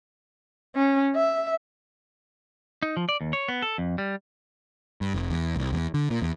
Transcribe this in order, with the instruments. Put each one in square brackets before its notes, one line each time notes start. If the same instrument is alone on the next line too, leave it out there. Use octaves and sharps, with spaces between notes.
[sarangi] C#4
E5
[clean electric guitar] D#4
F3
D5
D#2
C#5
B3
A4
F2
G3
[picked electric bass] G2
F1
E2
C2
E2
D3
A#2
E2